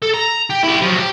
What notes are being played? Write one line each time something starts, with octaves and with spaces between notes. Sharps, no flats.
A4
A#5
G4
E4 G4
F3 F#3
G4